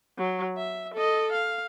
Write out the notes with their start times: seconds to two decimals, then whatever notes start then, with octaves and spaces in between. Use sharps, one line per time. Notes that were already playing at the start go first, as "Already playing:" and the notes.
0.18 F#3
0.57 E5
0.94 A4 D#5
1.32 F5